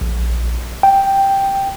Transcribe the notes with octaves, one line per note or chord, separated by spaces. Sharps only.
A#1
G5